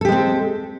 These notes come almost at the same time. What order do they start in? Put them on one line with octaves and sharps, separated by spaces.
A4 G4 G#3 C4